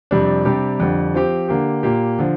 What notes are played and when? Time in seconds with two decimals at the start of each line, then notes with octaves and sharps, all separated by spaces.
0.11 F2 C3 G3 D4
0.45 C3 G3 D4 G4
0.80 F2 D3 G3
1.14 F3 C4 G4
1.49 D3 A#3 G4
1.83 A#2 A#3 G4
2.19 D3 F3